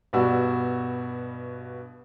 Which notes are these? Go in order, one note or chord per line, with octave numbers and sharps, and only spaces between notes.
G2 B2 G3 F#4 E6